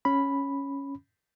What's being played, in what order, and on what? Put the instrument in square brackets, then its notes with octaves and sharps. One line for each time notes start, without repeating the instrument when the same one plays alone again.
[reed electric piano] C#4 B5